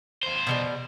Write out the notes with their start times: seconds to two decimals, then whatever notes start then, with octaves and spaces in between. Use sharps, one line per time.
0.23 E2 C5
0.47 B2 E3 G3